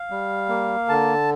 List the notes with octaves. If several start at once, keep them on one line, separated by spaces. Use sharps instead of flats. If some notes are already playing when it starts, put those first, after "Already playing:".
Already playing: F5
G3
A#3
D3 A5